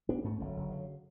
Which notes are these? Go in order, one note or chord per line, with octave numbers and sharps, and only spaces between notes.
A1 B3 D4
G#2 A3 C#4
F#1 D3 F#3
F#1
C#3